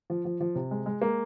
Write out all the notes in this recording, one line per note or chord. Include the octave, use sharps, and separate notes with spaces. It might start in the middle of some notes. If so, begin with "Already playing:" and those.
F3
F3
F3
C3
G#3
G#3
G#3 A#3